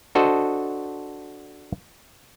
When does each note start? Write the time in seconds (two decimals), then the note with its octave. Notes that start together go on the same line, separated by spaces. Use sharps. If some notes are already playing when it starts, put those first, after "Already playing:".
0.15 D4 F#4 A4 C5 D#5